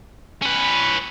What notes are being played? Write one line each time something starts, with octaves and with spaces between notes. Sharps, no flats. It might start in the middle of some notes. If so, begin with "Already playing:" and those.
C#4 B4